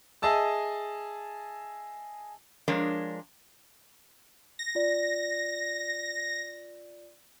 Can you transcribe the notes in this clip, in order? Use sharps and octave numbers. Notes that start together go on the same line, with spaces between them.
G#4 D#5 E5 A5 E6
F3 G#3 D4 A#4 C#5
A#6
F4 D5